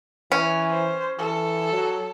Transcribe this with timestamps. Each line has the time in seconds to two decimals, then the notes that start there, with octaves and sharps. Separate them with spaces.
0.32 E3 C#4
0.71 C5
1.19 E3 A4
1.73 F#3